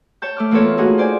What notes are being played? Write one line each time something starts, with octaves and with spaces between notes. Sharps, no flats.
C#5 A5 G6
A3 D6 F6
E3 A#3 B3 F4 A4 C#5
A3 A#3 D#4 F4 F#4 G#4
C5 D5 G#5